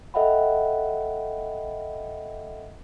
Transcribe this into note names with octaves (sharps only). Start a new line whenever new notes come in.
A4 D#5 E5 F#5 G5 B5